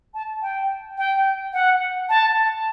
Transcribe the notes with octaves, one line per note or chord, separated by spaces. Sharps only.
A5
G5
G5
F#5
A5